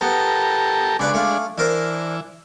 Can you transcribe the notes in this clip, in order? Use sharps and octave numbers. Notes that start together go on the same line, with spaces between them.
B3 G4 A4 A#4
C#3 G#3 D4 B4 D5
A3 F4
E3 D4 A#4 C5